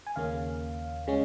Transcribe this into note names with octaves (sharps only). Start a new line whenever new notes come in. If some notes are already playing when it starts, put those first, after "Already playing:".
G#5
D#2 C#3 A#3 C#4 F5
C#3 G#3 C#4